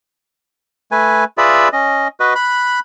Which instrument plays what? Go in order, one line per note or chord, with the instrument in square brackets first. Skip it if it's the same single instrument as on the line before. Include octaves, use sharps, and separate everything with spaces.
[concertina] A3 B4 G#5
F4 G#4 B4 D5 E5 B5
C#4 D#5
F#4 B4 D#5
B5 F#6